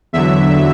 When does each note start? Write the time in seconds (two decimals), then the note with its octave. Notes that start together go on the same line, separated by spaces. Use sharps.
0.13 E2 D3 F#3 E5